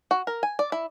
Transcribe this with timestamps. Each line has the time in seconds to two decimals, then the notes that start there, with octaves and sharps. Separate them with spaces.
0.11 F#4
0.27 A#4
0.43 G#5
0.59 D5
0.72 E4